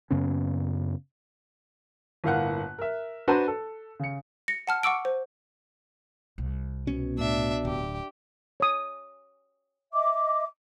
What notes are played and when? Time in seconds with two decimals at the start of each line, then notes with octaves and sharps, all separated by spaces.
0.11 F#2 C#3 B3 C#4
2.24 G1 A2 A#3 F5 F#5 F#6
2.79 A#4 E5
3.28 D4 F#4 B4 C5 A5 A#5
3.48 A4
4.00 C#3 C#7
4.48 A#6 C#7
4.67 F#5 A5 F6
4.83 F#5 C#6 D6 E6 D7
5.05 C5
6.38 C2
6.87 B2 B3 C#4
7.18 A2 A3 D4 E5
7.65 D1 G4
8.60 C#5 D#6
9.93 D#5 E5 D6